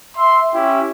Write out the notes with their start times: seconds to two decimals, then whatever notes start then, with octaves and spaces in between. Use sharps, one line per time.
0.16 E5 C6
0.53 C#4 E4 G4